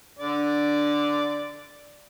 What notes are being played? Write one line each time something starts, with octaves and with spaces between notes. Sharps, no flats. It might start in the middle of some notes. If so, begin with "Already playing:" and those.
D3 D5